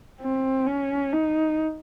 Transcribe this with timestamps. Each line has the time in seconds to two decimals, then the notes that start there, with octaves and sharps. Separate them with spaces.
0.21 C4
0.67 C#4
1.13 D#4